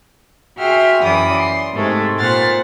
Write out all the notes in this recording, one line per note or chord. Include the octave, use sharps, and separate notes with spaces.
F#4 G#4 E5 G5 C6 F6
F#2 E3 D5 B5 D#6
C6
G#2 C3 G#3 A3
A#2 C5 F#5 F6 A6